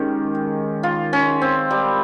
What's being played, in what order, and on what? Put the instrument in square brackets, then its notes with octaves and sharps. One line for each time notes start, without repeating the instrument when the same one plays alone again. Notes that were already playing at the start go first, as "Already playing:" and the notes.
Already playing: [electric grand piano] D#3 G#3 C#4 [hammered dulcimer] G4
[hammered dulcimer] F4
C#4
C4
G3